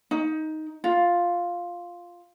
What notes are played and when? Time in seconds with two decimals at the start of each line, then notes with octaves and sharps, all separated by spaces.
0.11 D#4
0.84 F4